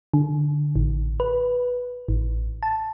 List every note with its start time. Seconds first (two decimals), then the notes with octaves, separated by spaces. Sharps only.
0.14 D3
0.76 A1
1.20 B4
2.08 A1
2.63 A5